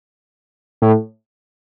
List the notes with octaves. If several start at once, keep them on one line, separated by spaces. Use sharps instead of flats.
A2